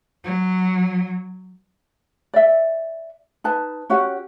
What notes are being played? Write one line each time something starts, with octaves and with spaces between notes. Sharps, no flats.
F#3
D5 E5
D#4 B4 A5
C#4 F#4 G4 F#5